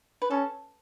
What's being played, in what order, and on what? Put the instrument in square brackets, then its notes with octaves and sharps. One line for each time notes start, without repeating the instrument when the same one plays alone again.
[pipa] B4
[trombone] C#4 [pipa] A4